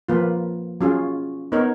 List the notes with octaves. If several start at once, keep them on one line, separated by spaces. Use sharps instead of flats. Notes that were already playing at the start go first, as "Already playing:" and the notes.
F3 A#3 F4 B4
F#3 C#4 F4 G#4
B3 D#4 A#4 C#5